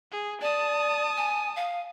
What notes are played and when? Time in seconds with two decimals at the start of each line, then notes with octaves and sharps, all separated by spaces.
0.12 G#4
0.41 D5 A5 D#6
1.17 G#5
1.56 F5